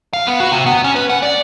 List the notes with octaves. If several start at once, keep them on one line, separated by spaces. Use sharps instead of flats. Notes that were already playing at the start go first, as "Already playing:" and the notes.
F5
B3
F#4
C3
B3
C#4
B4
F#5
D5